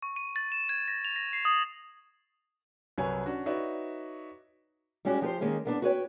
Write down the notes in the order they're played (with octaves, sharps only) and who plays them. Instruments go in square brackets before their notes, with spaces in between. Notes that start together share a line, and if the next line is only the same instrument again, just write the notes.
[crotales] C#6
D#7
A6
E7
G#6
A#6
F7
A#6
C7
D#6
[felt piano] C2 F#3 B4 C#5 G#5
C#4 D4 F#4
D#4 F#4 B4 C#5 D5 E5
[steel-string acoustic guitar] G3 G#3 C#4 F#4 G4
F3 G4 B4 C5
D#3 G#3 A#3 C#4
A#3 B3 D4
F#4 B4 C#5 G5